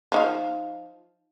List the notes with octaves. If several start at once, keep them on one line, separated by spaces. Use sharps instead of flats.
F3 D#4 F5